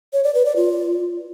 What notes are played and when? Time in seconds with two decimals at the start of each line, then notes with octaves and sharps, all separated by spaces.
0.13 C#5
0.24 D5
0.35 B4
0.45 D5
0.56 F4